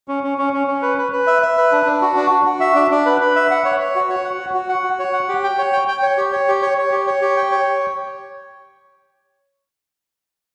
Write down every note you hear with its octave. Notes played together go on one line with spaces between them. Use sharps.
C#4
C#4
C#4
C#4
C#4
B4
B4
B4
E5
E5
B4
D4
D4
F#4
D4
F#4
F#4
E5
D4
D4
B4
B4
E5
F#5
C#5
C#5
F#4
C#5
F#5
F#4
F#4
F#5
F#4
C#5
F#5
G4
G5
C#5
G5
G5
C#5
G4
C#5
G4
C#5
C#5
G4
C#5
G4
G5
C#5